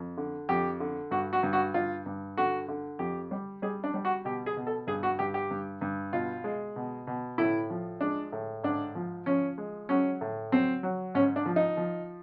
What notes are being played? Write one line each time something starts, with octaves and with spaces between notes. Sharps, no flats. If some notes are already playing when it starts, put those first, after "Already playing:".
Already playing: F2
D3
F2 G4
D3
G2 F#4
F#4
G2
F#4
G2 F4
G2
D3 F#4
D3
F2 G4
G3
G3 G#4
D4
G3
F#4
B2 G4
G#4
B2
A4
G2 G#4
F#4
G2 G4
G4
G2
G2
B2 F4
G#3
B2
B2
A2 E4
F3
G#3 D4
A2
G#2 D4
F3
F3 C#4
G#3
F#3 C#4
A2
F#3 C4
F#3
G#2 C#4
D4
F3
D#4
F3